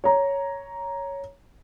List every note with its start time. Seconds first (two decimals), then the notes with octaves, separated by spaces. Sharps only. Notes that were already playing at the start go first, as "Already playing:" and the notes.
0.04 C#5 A#5